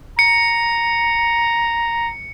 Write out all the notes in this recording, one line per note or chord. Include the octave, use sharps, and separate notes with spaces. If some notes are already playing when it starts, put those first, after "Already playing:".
A#5 C#7